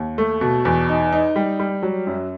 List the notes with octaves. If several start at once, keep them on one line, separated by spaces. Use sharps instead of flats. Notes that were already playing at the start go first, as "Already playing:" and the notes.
Already playing: D#2
A3
B2
E2
D#4
D#4
G3
G3
F#3
F#2